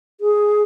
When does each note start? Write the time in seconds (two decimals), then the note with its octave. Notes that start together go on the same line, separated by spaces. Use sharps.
0.21 G#4